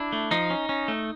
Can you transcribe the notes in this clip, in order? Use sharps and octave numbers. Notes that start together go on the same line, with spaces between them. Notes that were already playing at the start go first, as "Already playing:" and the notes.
Already playing: D4 E4
A3
F3 D#4
C#4
C#4
A3